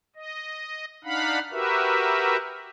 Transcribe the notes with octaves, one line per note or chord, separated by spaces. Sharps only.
D#5
D4 D#4 F5 F#5 B5
F#4 G4 A#4 B4 E5